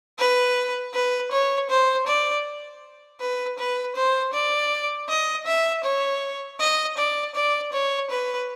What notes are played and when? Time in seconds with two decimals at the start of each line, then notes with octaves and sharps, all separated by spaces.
0.19 B4
0.94 B4
1.32 C#5
1.70 C5
2.07 D5
3.20 B4
3.58 B4
3.96 C5
4.33 D5
5.09 D#5
5.47 E5
5.84 C#5
6.60 D#5
6.98 D5
7.35 D5
7.73 C#5
8.11 B4